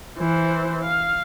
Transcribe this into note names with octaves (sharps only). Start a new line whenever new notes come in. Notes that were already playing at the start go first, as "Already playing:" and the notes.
E3 C5
F5